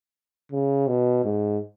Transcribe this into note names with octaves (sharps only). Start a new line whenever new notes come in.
C#3
B2
G#2